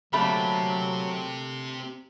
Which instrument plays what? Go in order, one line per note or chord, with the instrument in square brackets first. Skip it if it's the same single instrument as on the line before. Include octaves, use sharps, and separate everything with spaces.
[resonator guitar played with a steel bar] D3 A3 A#3 [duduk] F#3 [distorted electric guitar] C4 G4 [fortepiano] B5